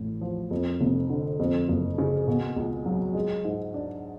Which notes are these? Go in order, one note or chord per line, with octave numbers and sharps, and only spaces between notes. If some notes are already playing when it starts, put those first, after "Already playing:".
Already playing: A1 A2
F3
F2
F1
D3
F2
F#1
C#3
B2
C#2
F#3
G#3
G#2
D4